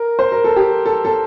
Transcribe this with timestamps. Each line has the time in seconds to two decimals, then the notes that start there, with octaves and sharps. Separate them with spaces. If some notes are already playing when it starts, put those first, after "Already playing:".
Already playing: A#4
0.19 C5
0.32 A#4
0.44 A4
0.56 G4
0.86 A4
1.05 A4